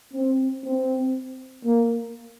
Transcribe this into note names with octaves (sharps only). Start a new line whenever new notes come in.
C4
C4
A#3